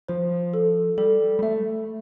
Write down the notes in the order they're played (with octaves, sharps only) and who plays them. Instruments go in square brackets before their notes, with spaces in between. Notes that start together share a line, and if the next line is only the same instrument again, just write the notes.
[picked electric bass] F3 [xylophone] C5
[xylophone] A4
[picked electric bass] G3 [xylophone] A4
[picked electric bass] G3
[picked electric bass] A3 [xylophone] E5